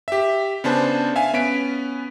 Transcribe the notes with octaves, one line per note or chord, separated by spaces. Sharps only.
G4 E5
C#3 B3 D4 C5 A5
E5 F5 G#5
B3 C#4 B6 D7